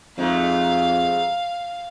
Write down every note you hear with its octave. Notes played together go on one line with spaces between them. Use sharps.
F2 G#2 A3 F5